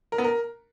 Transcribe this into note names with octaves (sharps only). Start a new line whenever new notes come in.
A#4
B3
A#4